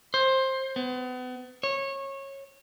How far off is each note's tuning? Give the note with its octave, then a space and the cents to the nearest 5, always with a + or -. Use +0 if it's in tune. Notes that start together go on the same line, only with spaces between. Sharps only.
C5 +15
B3 +35
C#5 -20